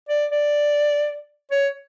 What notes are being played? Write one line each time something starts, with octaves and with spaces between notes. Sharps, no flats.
D5
D5
C#5